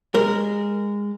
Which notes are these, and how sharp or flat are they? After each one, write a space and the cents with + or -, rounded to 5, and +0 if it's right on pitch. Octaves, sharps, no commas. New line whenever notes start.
G#3 -20 A#4 -10